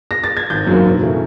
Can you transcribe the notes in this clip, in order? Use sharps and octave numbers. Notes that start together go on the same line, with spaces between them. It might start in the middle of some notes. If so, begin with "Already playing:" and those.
A#6
A6
G#6
G#1 G6
F#2 D#3 F#3 A#3
E1
C#3 E3 A3